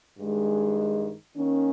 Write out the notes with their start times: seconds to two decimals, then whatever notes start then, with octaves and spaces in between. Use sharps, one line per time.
0.18 G2 D#3 G#3
1.36 D#3 A#3 C#4